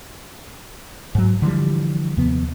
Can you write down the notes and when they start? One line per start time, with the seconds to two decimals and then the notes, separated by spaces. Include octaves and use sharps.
1.15 G#2 F#3
1.42 D3 E3 F3 G3
2.17 D#2 C3 F3 B3